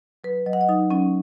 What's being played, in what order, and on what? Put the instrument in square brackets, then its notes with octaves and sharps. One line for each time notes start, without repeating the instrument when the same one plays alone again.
[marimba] F#3 B4
F#3 D#5
F#5
D#5
F#3 D#4
F#3 C#4